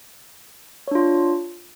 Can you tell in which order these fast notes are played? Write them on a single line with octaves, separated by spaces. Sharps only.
C#5 D4 F4